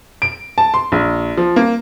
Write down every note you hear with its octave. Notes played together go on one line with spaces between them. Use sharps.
D7
A5
C6
A#1
F3
A#3